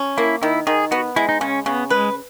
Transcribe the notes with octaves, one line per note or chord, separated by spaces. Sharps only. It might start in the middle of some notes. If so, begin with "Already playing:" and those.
Already playing: C#4
A#3 E4
D#3 E4
D#3 G#4
B3 F#4
G#3 E4
D#4
C#3 C#4
C#3 B3
G#3 B4